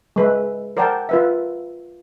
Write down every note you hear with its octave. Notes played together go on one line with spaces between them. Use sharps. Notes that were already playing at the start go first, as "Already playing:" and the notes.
G#3 B4 E5
A#4 C5 D5 F#5 G5 A5
F4 B4 E5